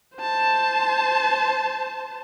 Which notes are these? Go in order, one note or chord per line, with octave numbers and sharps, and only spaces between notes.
C5 A5